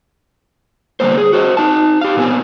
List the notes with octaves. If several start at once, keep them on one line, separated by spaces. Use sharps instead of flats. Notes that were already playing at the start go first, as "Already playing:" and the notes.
D3 G3 A#3 B3 C5
G#4
F#4 C5 C#5 D#5
D#4 A5
G4 F5
A#2 B3 C4 G#5